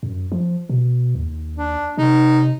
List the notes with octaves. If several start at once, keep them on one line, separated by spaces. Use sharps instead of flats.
F#2
F3
B2
D#2
D4
C3 D#4